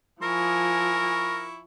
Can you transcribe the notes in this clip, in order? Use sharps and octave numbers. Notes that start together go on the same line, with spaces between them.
F3 E4 A#4 G#5 C#6